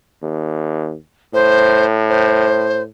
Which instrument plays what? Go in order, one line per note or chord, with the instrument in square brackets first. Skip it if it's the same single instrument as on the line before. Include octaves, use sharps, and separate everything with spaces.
[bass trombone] D#2
[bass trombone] A2 [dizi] C5
[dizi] C5